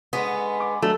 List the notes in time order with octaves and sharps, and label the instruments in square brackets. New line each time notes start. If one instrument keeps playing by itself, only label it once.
[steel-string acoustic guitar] D3 G#3 C#4 [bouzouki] B3
[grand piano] D6
[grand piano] F#3 D4 [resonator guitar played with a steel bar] A3